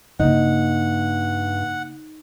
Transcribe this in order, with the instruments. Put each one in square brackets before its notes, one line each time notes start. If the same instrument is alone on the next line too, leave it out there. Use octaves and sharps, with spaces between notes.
[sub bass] G2 [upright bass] C#3 A#3 [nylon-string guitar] D#4 [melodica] F#5